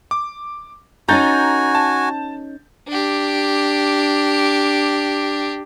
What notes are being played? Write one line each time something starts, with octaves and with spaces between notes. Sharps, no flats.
D6
C#4 D#4 F#4 A4 G#5 A#5 G6 A6
A5
D4 G4